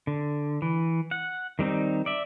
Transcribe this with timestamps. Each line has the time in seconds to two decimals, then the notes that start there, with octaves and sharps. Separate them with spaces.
0.07 D3
0.62 E3
1.11 F#5
1.59 D#3 G3 C4 D#4
2.06 D5 E5